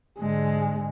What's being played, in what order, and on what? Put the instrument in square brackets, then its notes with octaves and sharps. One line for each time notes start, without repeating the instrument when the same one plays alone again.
[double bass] G#2 D3 [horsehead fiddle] G#3